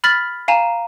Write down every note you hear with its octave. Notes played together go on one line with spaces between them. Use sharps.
B5 F6 A6 B6 F#7
F5 G#5 A#5 E7